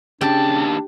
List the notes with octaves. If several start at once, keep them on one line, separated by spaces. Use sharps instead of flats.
D#2 C#3 D4 G4 A5